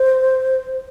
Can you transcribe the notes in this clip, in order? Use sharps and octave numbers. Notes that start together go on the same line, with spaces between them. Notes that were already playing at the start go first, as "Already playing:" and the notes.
Already playing: C5